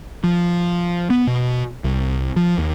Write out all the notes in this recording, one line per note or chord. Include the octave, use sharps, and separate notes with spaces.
F3
B3
B2
C2
F3
D#2